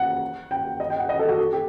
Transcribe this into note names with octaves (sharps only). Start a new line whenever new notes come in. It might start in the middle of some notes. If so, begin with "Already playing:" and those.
Already playing: F#5
G5
D#5
G5
F#5
D#5
A4
F#4
A4
G4